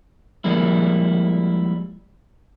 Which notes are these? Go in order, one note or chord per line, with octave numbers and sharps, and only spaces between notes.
F3 G3 G#3 A#3 E4